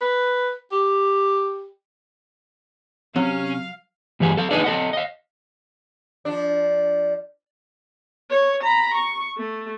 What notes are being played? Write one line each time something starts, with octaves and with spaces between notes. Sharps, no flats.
B4
G4
C3 F#3 C#4 F5
G2 E3 G4 G#4
A4 F5
D4 D#4 G#4 B4 D5 D#5
A4 D#5 F#5
D#5 F5
F3 D4
C#5
A#5 B5
C#6
A3